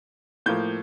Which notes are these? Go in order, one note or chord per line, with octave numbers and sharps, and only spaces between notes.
A2 F3 A#3 G6